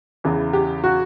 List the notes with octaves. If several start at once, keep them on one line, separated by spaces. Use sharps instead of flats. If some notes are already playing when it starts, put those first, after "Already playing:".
E2 C#3 E3
G4
F#4